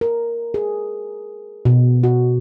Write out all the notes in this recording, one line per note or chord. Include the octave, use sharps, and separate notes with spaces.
A#4
G#4
B2
F#4